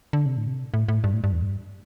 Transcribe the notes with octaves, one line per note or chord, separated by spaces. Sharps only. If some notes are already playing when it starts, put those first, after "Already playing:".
D3
C3
A2
C3
A2
A2
G2
A2
G2
E2
G2